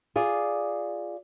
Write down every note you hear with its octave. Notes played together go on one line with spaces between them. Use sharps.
F4 G#4 D5